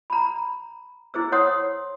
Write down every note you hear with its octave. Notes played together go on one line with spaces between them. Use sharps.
A#5 B5
E4 G#4 C5 E6
C5 C#5 F#5 C6 D#6